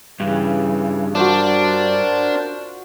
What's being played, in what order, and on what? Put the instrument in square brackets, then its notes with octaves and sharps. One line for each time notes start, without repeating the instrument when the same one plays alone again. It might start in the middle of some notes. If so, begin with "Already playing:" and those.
[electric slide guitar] G2 [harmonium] C#3 E3
[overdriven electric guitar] D4 [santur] F4 F#4 [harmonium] A#4 C5 A5